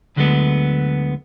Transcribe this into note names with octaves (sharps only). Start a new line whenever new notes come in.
D2 D3 F#3 G#3 A3 B3